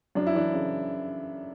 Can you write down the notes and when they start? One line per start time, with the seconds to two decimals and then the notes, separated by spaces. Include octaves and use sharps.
0.15 F#2 D4
0.27 E4
0.34 E3 D4
0.53 C#3